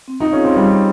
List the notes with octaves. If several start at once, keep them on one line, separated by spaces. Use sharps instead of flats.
C4
D#4
C#4 F4 G#4 C#5 F5
C4
G3 C4